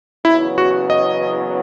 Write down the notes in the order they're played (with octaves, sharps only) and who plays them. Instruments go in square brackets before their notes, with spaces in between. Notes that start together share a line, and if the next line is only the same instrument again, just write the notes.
[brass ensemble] F#1 E2 C#3 F#3 B3 [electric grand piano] E4
[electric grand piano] F#4
D#5